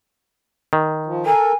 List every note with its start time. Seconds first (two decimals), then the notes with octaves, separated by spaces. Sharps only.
0.73 D#3
1.06 F3
1.26 A4 A#4 G#5